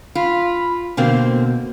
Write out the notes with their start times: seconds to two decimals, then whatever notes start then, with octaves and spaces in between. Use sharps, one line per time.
0.15 F4 B5
0.97 B2 D3 A#3 C4